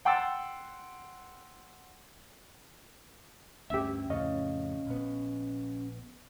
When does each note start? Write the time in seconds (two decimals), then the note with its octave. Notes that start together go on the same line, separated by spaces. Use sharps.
0.05 F#5 G5 C6 E6 A6
3.70 D2 G2 C#4 G4 E5
4.10 F2 A2 C#3 C#5 D#5 F5
4.86 A#1 B3